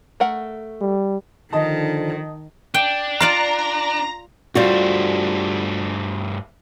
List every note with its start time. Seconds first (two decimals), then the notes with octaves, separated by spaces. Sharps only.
0.20 A3 A#4 F#5
0.81 G3
1.52 D3 D#3 F3 D#4 D#5 A5
2.74 D4 G5
3.20 F4 D5 F5 A#5
3.59 A#5
4.55 G2 G3 A3 F4 F#4 C5